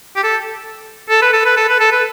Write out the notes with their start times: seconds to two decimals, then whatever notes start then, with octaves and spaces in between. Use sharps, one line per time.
0.16 G4
0.23 A4
1.10 A4
1.22 B4
1.33 A4
1.45 B4
1.57 A4
1.68 B4
1.80 A4
1.92 B4